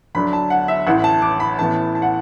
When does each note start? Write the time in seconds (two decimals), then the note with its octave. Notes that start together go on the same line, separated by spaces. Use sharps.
0.15 D2 D3 F#3 D4 B5
0.33 A5
0.50 F#5
0.68 E5
0.87 A1 A2 E3 F#5
1.04 A5
1.22 D6
1.40 B5
1.59 A1 A2 E3 B3 A5
1.95 A5
2.02 F#5